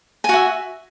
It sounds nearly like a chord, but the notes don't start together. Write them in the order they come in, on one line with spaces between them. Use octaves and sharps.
G#5 F#4 E5